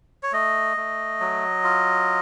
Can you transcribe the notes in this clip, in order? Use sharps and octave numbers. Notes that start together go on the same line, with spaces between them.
C#5
A3 D#5
A3
F#3
F4